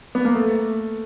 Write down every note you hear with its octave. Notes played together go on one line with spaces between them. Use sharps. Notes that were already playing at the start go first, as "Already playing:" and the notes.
B3
A#3
A3